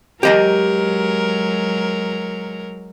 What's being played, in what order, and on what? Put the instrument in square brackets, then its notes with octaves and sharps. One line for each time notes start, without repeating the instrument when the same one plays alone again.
[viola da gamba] F#3 G#3 A#4 [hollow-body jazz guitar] G4 D#5 A#5